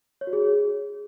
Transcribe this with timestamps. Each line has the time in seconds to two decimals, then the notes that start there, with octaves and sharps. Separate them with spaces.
0.21 C#5
0.27 F#4
0.33 G#4